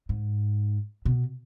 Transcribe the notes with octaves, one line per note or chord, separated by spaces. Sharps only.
G#2
B2